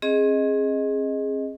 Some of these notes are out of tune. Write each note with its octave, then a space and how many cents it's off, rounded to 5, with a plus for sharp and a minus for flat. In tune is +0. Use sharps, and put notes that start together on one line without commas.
C4 +45 G#4 +0 D#5 +0